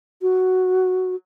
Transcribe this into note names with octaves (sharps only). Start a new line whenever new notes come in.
F#4